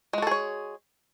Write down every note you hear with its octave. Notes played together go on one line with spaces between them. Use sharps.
G#3 F#4 G#4 A4 C#5